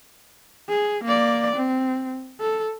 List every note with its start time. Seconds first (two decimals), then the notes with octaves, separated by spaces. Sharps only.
0.69 G#4
1.04 A#3 D5
1.56 C4
2.41 A4